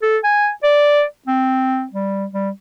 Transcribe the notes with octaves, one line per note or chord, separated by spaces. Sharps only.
A4
G#5
D5
C4
G3
G3